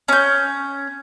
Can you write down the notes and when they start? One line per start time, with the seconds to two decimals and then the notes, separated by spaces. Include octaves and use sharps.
0.08 C#4 G6